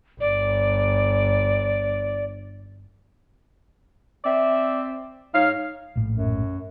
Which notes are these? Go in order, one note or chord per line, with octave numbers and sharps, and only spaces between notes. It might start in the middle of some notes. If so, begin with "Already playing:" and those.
G1 D5
C4 D5 E5
G#2 D#4 C#5 F5
A#1 A2
F#2